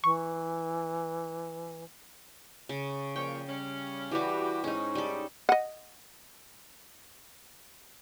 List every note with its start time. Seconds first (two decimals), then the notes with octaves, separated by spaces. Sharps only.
0.04 E3 C#6
2.69 C#3
3.16 A#2 F3 C#5 G5
3.48 G3 C#4
4.11 E3 G3 F#4 G4
4.64 G#2 C#4 D#4
4.95 G3 A4
5.49 D#5 F#5